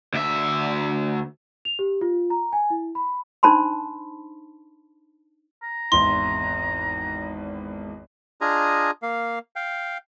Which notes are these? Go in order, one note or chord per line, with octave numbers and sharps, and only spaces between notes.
D2 E5
F7
G4
F4
A#5
G#5
E4
B5
D4 D#4 C5 A5 B5 C6
A#5
G#1 E2 E4 C6
D4 F4 G#4 D#5 G#5 A#5
A#3 F5
F5 G5